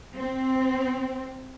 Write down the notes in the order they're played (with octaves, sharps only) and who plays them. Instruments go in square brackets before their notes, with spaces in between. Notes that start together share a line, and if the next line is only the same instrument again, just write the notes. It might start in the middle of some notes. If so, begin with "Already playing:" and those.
[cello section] C4